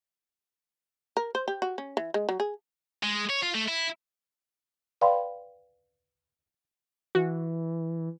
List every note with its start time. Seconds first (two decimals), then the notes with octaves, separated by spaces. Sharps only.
1.17 A#4
1.35 C5
1.48 G4
1.62 F#4
1.78 C#4
1.97 E3
2.14 G#3
2.29 F#3
2.40 G#4
3.03 G#3
3.30 C#5
3.43 F4
3.55 A3
3.68 E4
5.01 B4 D5 F5 G5 B5 C6
7.15 E3 F#4